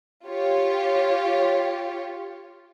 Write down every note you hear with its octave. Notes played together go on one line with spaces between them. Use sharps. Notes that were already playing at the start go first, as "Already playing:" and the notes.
F4 G4 C#5